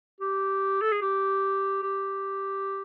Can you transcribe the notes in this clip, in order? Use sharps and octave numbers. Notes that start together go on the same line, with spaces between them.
G4
A4
G#4
G4
G4